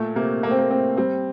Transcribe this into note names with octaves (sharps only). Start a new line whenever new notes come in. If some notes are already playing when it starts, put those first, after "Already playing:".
Already playing: A#2 A3
C3 A#3
A3 A#3
C4
A#3
A2 C4
G3 C4